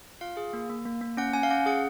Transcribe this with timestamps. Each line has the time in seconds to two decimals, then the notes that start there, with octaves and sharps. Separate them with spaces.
0.21 F4 F5
0.37 G#4
0.53 A#3
0.69 A#3
0.85 A#3
1.01 A#3
1.17 C#4 F#5
1.33 C#4 G#5
1.43 F5
1.50 C#4 F#5
1.66 G#4 F#5